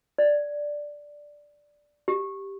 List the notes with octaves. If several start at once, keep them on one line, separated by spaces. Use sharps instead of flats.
D5
G4